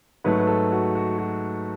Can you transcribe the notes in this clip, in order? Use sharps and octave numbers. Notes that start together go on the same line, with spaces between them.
G#2 F#3 A3 B4
B4
A4
F#4
F#4
F#4